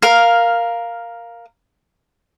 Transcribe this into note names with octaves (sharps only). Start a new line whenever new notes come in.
A#4 F5